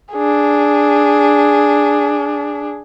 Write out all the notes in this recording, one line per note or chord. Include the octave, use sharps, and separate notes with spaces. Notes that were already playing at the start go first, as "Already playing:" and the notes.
D4 G#4